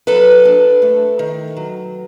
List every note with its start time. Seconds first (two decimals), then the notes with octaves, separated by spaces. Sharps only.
0.07 F#3 A4 B4
0.45 D4
0.82 A3
1.19 D#3
1.57 F#3